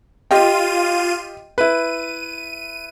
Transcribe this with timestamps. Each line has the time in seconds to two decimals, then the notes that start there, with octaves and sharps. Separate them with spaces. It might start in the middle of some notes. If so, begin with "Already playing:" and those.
0.31 F4 G4 D#5 G5 D#7
1.58 E4 B4 D#7